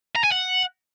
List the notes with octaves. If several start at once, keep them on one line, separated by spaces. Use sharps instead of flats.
A#5
G#5
F#5